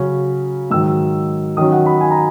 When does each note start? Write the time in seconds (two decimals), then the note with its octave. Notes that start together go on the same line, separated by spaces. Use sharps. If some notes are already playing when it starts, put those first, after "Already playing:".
Already playing: C#3 F#3 C#4
0.70 G#2 D#3 F#3 E6
1.57 D#3 F#3 C#4 D#6
1.72 F#5
1.86 B5
2.01 G#5
2.11 A#5